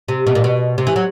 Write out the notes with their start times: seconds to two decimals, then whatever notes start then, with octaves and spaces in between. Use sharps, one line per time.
0.08 C3
0.27 B2
0.35 A#2
0.44 B2
0.78 C3
0.87 E3
0.96 F#3